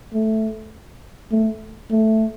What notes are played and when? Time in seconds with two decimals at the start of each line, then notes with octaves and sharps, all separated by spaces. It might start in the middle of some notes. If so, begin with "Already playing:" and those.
0.14 A3
1.31 A3
1.91 A3